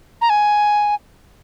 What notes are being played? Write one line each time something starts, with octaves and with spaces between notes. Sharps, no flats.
A#5
G#5